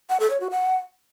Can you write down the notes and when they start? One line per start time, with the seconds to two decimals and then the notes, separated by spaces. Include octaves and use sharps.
0.10 F#5
0.20 A4
0.30 C#5
0.40 F#4
0.51 F#5